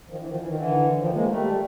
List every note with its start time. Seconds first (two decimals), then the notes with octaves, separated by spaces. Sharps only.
0.10 D#3 F3
0.20 D3 E3
0.29 D#3 F3
0.39 E3
0.48 D#3
0.56 D3 E3
0.99 D#3 F3
1.14 G#3 A#3
1.28 G3 A3